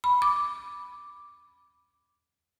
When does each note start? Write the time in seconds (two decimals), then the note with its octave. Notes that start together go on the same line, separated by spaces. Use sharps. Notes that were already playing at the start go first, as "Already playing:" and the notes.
0.04 B5
0.22 D6